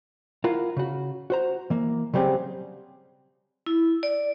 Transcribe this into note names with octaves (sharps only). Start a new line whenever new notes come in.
E4 F4 A#4 F5 F#5
C#3 F#4
F#4 C5 A#5
E3 A#3
C#3 F#3 G3 C4 G4 G#4
E4
D5